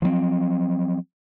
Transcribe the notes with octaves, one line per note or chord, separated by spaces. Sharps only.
F3 F#3 A#3 C4